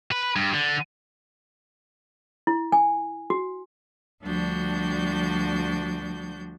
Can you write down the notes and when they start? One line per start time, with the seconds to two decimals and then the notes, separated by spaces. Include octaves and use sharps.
0.12 B4
0.36 G2
0.54 D3
2.47 E4
2.72 G#5
3.30 F#4
4.23 D2 F3 G3 D4 F#4 G6